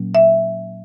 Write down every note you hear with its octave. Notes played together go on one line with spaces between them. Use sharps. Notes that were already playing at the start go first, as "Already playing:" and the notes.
Already playing: A#2 F#3 A#3 C#4
E5